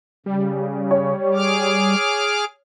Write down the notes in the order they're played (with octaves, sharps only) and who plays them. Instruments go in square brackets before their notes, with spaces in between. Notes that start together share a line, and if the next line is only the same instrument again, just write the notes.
[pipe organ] C#3 [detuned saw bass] G3
[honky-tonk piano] C#5
[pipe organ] G#4 D6 F6